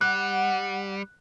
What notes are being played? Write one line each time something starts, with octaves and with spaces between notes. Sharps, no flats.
G3 F#5 F#6